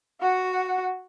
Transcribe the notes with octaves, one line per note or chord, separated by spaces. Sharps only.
F#4 F#5